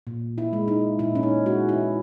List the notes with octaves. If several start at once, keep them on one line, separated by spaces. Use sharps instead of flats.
A#2
E4
G#3
D#4
A#2 E4
C#4
D#4
G#3 F#4
E4